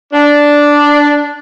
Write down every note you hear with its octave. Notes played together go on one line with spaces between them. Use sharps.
D4